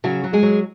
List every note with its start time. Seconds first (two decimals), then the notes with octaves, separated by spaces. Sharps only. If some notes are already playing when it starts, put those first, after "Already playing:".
0.04 C#3 F#3 F#4
0.24 F#3
0.33 G#3 G#4
0.43 F#3